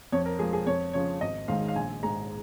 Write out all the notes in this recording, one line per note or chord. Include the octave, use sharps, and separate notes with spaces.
F2 C#5
A#4
F3 G#3 G#4
G#4
F2 C#5
C#3 F3 C#5
G#1 D#5
G#2 D#3 G#3 F5
F5
A#1 G#5
G#2 G#3 A#5